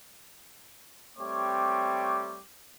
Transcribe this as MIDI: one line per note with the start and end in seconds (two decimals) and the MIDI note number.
1.18 2.40 55
1.18 2.40 57
1.18 2.40 60
1.18 2.40 67
1.18 2.40 73
1.18 2.40 86